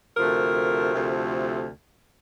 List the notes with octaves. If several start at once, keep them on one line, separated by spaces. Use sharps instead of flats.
D2 C3 F3 A3 A#4
D2 C3 F3 A3